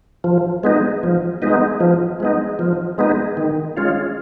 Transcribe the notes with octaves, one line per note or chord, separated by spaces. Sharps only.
F3
G#3 B3 D#4
F3
G#3 B3 D#4
F3
G#3 B3 D#4
F3
G#3 B3 D#4
D#3
G#3 C#4 F4